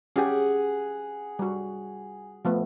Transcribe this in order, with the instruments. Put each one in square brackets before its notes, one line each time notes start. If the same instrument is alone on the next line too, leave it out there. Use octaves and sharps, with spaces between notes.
[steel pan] C#4 G4 [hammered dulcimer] G#4 F#5 G#5
[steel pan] G3 F#4
F3 A3 B3